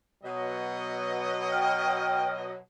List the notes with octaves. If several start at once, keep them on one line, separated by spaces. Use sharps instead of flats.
B2 F#3 D#5
G5 F6